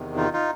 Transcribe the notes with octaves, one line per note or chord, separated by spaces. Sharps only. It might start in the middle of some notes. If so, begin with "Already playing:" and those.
Already playing: E2 C3 D#3
D#4 F4
D#4 F4